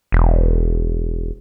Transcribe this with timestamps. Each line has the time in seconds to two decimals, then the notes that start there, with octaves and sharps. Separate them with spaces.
0.12 E1